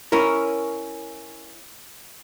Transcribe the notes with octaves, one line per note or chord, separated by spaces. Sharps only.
C#4 E4 A#4